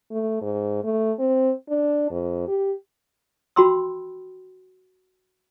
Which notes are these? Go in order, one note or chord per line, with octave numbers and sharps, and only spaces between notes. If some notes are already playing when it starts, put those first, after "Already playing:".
A3
G#2
A3
C4
D4
F2
G4
F#4 G5 B5 C6 E6